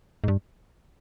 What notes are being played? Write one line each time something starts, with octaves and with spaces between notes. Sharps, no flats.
G#2
G2